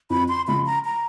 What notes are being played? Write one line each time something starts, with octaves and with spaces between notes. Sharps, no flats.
F2 B5
C6
C#3 F3 G#3 B5
A#5
A#5